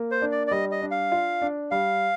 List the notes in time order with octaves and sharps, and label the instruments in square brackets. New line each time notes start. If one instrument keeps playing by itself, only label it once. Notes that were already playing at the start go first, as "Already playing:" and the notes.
Already playing: [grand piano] A#3
[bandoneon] C5
[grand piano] D4
[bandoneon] D5
D5
[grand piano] G3 [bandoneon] D#5
[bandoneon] D#5
[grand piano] D4
[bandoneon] F5
[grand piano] F4
D4
[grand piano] G3 [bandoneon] F5